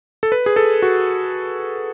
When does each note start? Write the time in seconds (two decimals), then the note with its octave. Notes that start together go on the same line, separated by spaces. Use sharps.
0.23 A4
0.32 B4
0.46 G#4
0.56 A4
0.82 F#4